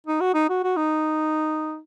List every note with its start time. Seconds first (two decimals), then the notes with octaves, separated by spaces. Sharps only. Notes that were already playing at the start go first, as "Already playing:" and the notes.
0.07 D#4
0.21 F#4
0.34 D#4
0.49 F#4
0.63 F#4
0.77 D#4